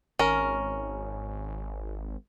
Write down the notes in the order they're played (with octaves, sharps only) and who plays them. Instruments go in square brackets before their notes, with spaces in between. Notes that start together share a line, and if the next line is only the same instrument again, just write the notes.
[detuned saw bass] G#1 [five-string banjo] C#4 A#4